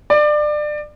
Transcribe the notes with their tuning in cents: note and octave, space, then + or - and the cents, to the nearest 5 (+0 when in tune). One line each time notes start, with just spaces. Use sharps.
D5 +25